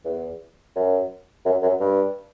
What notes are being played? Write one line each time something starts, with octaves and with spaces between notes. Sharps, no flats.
E2
F#2
F#2
F#2
G2